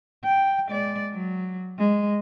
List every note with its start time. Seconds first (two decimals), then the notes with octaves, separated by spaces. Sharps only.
0.25 G5
0.67 G#3 D5
1.14 F#3
1.78 G#3